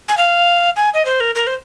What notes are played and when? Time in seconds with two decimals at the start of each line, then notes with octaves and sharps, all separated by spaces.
0.08 G#5
0.17 F5
0.76 G#5
0.94 D#5
1.05 C5
1.20 A#4
1.35 A#4
1.47 C5